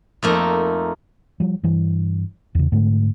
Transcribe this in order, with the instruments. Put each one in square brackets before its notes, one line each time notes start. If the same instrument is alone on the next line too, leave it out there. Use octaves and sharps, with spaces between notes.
[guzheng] F2 A3 A#3 D#4
[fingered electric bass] F3 G3
G2 E3
E2 C#3
G#2 D3 A3